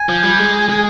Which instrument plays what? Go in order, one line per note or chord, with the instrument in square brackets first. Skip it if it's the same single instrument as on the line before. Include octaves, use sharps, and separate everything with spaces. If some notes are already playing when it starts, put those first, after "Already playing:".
Already playing: [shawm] G#5
[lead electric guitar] F3
G3
G#3
G#3